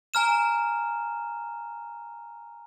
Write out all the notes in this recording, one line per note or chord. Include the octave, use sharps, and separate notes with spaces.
G#5 A#5 F6 E7